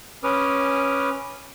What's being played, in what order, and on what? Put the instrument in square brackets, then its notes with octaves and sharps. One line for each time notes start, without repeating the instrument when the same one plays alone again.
[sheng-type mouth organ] C#4 B4 D6 D#6 F6